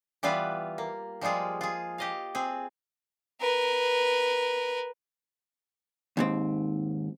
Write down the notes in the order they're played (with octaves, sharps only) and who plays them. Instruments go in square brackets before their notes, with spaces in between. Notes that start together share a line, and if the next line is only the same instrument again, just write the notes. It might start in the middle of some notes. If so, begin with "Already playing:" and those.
[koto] E3 G3 B3 F4 B4 F5
A#3
F3 G3 G#3 F4 G#4
F4 G#4
G4 D#5 F5
C4 G#4
[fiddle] A#4 B4
[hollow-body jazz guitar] D#2 G#2 C4